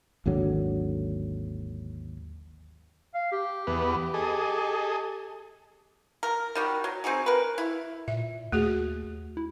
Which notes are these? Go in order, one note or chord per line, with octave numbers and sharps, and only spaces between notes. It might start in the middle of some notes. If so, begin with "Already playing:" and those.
G#1 D#2 D3 F#3
F5
G4
E2 B3
G#4 A4 D#5
A#4
D#3 G3 F#4
F#3
C4 D#4 F#4 G#4
A#4 B4
E4
A#2 E5
D#2 A3 F#4 G#4
E4